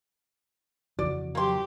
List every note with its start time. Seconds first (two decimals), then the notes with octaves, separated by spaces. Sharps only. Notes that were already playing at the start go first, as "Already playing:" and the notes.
0.99 F2 C#3 E3 F#4 D5
1.35 F#3 A#3 G4 C6